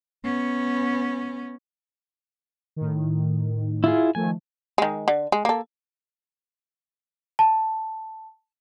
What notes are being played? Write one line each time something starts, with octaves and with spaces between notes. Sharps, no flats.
B3 C#4
A2 D#3
E4 F4 G#4
D#3 F3 A3 G#5
D#3 G#3
D3
G#3
A#3 A4
A5